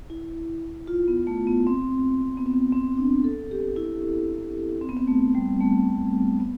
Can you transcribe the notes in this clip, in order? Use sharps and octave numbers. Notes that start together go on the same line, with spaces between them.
E4
F4
B3
A3
B3
C4
B3
C4
C4
D4
A4
G4
E4
C4
B3
C4
A3
G3
A3
B3